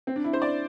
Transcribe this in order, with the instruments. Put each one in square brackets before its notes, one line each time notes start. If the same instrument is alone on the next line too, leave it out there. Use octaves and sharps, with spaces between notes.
[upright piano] C4
D4
E4
C5
D5